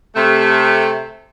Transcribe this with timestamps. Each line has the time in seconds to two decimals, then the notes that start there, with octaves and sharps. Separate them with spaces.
0.15 C3 A3